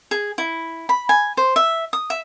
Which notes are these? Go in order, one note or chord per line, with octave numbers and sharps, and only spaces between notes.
G#4
E4
B5
G#5
C5
E5
D#6
E5